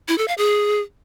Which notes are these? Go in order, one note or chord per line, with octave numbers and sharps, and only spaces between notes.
E4
A4
F5
G#4